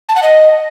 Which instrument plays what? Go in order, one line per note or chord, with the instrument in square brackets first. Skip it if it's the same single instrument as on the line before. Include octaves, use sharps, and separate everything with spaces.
[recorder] A5
F#5
D#5